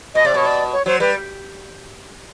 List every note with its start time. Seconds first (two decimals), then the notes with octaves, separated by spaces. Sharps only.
0.15 B2 D#5
0.25 C3 D5
0.34 B2 C#5
0.46 D5
0.73 C#5
0.86 F#3 C5
1.00 G3 B4